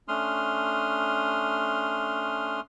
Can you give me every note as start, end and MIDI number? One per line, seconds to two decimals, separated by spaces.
0.08 2.60 57
0.08 2.60 61
0.08 2.60 62
0.08 2.60 84
0.08 2.60 87
0.08 2.60 89